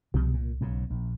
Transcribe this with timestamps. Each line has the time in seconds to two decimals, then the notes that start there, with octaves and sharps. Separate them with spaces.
0.14 C2 B2 F3 G3
0.34 A#2
0.61 B1 G#2 C#3
0.90 A#1